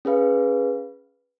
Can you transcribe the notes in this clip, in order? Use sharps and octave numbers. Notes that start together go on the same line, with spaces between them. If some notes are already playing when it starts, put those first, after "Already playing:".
C#4 G#4 B4 F5